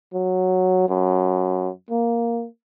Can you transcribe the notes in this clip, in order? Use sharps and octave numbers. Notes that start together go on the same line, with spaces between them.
F#3
F#2
A#3